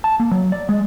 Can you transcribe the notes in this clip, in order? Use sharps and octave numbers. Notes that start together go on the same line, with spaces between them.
A5
A#3
F#3
D5
G#3